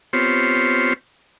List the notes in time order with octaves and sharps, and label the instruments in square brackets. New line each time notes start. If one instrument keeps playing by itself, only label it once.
[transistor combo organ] B3 C4 F4 G4 C5 C#5